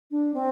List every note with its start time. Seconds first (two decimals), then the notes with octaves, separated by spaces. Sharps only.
0.11 D4
0.34 C4